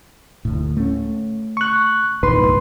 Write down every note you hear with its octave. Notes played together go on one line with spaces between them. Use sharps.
D2 A2
A3 C#4
C#6 F#6
E2 A#2 D#3 B4 C6
C2 G2